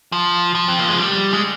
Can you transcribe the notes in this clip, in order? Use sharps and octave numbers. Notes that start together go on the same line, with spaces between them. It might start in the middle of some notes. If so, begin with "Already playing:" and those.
F3
F3
C4
A#3
G#3
G3
G#3